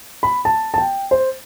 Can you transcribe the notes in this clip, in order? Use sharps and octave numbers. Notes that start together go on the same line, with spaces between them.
B5
A5
A5
G5
C5